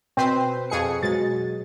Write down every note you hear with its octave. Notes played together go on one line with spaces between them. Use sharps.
B2 C4 B4 C5
F2 G#4 C#7
B2 F#3 G#3 A6